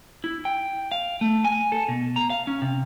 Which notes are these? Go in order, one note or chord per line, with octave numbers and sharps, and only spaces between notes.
E4
G5
F5
A3
G#5
A4
B2
A#5
F5
C#4
C3